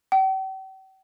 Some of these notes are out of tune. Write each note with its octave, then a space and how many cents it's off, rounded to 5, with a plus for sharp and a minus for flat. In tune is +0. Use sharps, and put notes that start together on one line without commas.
G5 -45